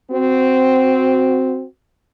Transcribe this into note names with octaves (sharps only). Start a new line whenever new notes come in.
C4 F#4